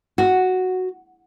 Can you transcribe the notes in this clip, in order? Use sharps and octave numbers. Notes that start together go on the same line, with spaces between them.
F#4